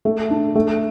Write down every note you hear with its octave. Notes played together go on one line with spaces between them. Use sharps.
A3
D4
A3